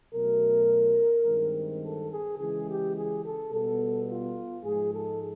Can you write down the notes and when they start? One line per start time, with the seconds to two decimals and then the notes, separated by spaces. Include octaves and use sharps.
0.13 B2 F#3 A3 A#4
1.25 G2 D#3 G#3 C4
1.81 A4
2.10 G#4
2.38 C#3 E3 G#3 G#4
2.66 G4
2.94 G#4
3.22 A4
3.50 B2 G3 B3 A4
4.07 F4
4.63 G#2 F3 G#3 G#4
4.91 A4